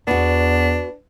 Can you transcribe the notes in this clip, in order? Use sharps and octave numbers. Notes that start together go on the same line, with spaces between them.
E2 B3 D4 F#4